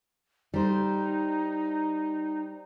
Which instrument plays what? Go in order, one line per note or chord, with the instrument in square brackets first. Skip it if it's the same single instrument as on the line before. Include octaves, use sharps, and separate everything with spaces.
[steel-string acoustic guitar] G3 C5 [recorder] D#4